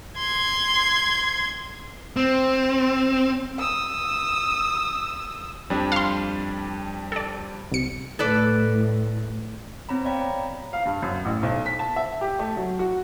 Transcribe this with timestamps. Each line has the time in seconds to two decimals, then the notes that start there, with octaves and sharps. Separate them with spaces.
0.17 C6 G#6
2.17 C4
3.58 D#6 E6
5.70 F2 G3 D4
5.92 F5 C6
7.12 A4 D5
7.71 C2 C#7
8.19 A2 A4 B4 D5
9.89 B3 C4 C#5 A#5 B5
10.05 C#5 D5 F5 G5 B5
10.21 A#5
10.73 F5
10.86 G2
11.02 F#2
11.25 A1
11.43 B1
11.66 B6
11.79 A5
11.96 E5
12.21 G4
12.39 A3
12.57 F#3
12.79 F#4